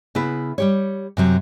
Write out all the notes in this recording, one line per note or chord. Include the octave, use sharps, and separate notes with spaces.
C#3 B3 E4 B4
G3 G4 C#5
F#2 C3 F#3